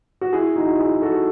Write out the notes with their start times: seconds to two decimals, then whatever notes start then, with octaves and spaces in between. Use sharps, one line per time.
0.21 F#4
0.33 E4 G#4
0.56 D#4 F#4
0.79 E4 G#4
1.02 F#4 A4